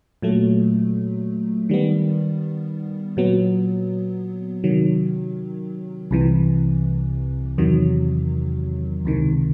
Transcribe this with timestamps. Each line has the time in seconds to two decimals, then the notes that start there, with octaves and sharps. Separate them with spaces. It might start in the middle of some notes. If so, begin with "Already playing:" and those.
0.22 A#2 F#3 A3
1.69 D#3 G3 B3
3.17 A#2 F#3 B3
4.64 C3 D#3 F#3
6.11 C2 C3 E3
7.58 E2 C3 D#3 F#3
9.05 C#2 C3 D#3